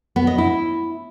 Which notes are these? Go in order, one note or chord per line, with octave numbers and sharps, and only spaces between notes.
B3
D#5
E4